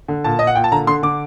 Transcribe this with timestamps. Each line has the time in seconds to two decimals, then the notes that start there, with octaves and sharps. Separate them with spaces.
0.08 D3
0.24 A#2 A5
0.39 A#2 D#5
0.47 F#5
0.55 A#2 G5
0.64 A5
0.72 D3 A#5
0.87 D3 C6
1.03 D3 D6